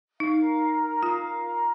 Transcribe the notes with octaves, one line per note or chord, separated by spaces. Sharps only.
D#4 F5
A#4
A#5
A#4
F4 F5
A#4
A#5